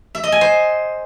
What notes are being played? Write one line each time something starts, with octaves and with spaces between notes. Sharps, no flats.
E5
D#5
G#5
C5